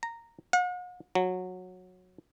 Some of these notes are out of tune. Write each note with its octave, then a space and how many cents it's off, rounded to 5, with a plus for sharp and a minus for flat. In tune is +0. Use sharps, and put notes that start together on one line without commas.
A#5 -10
F#5 -45
F#3 -15